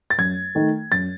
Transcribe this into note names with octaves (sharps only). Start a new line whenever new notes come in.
A6
F#2 G#6
D#3 A3
F#2 A6